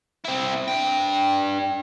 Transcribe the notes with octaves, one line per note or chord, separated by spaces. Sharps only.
C4 E4
D4 G5